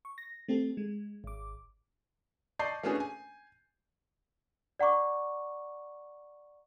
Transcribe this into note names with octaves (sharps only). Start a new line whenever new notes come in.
C#6
A#6
A3 C4 G4 A4
G#3
G#1 D6
D5 D#5 A5 C#6 G6 C7
A3 B3 C#4 D4 F#4 G#4
G#5
D5 F#5 A#5 C#6 D6